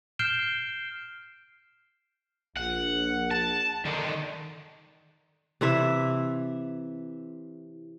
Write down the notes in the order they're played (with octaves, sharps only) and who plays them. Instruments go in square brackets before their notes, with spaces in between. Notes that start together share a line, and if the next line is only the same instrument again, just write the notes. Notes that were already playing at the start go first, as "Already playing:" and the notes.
[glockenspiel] F6 G6 C7 D7 E7 G7
[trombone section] A#1 [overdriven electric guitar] F#5
[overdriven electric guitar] A5
D3 D#3
[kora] C3 E3 E4 E5